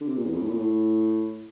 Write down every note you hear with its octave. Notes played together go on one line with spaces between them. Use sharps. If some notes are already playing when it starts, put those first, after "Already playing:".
D3
C3
A#2
E2
F2
A2
A#2
A2